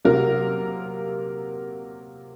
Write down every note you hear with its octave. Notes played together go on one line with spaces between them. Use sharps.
C3 F#3 A#3 A#4